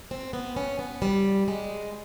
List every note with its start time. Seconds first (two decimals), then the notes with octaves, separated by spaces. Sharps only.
0.11 C4
0.33 B3
0.56 C#4
0.79 B3
1.02 G3
1.48 G#3